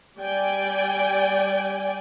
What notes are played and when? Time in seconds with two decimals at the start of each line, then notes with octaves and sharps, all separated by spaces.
0.19 G3 D5 G5 G#5